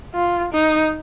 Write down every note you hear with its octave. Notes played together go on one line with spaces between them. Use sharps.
F4
D#4